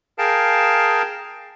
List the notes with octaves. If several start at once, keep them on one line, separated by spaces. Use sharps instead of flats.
G#4 A#4 F5 G5 A5